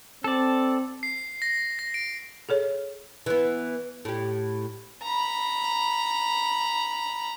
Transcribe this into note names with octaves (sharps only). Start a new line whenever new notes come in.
C4 A4 D5
C7
A#6
A#6
D7
G#4 A4 C#5
E3 B3
A2 G4
A#5 B5